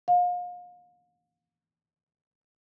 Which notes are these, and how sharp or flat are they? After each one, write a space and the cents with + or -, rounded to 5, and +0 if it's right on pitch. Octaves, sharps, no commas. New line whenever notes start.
F5 +35